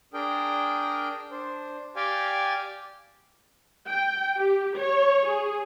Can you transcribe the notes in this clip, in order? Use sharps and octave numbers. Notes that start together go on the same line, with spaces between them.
D4 G#4 A#4 G5
D4 C5
G4 D5 F5 G5 G#5
G5
G4
C#5
G#4